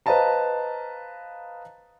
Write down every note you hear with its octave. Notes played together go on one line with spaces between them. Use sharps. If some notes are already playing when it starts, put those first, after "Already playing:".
B4 C5 D#5 F5 A5 A#5